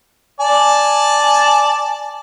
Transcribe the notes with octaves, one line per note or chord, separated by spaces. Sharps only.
D5 G#5 A5